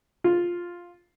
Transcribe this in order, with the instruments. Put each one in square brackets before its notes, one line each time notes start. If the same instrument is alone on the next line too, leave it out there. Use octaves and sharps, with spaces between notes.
[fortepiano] F4